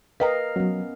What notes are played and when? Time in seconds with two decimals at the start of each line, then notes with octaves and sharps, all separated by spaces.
0.20 A#4 B4 D#5 F5 G5 A#5
0.56 F#3 B3 C#4